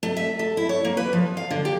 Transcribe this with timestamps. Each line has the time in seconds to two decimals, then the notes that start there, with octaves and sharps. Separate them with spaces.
0.03 A3
0.17 E5
0.39 A4
0.57 E4
0.69 C#5
0.85 A#3
0.97 B4
1.13 F3
1.37 F5
1.50 D3
1.65 G4